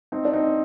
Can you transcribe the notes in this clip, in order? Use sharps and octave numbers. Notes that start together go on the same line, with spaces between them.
C4 D#4
D4
C4 D#4